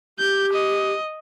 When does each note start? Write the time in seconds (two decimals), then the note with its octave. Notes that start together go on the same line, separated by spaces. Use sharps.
0.19 G4 G6
0.53 D#5